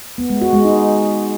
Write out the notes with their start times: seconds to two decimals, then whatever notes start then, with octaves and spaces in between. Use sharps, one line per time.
0.18 B3
0.30 G#3
0.41 F#4
0.53 G#3
0.65 D#4